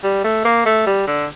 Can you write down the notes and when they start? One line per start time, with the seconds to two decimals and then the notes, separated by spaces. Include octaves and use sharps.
0.04 G3
0.24 A3
0.45 A#3
0.66 A3
0.87 G3
1.07 D3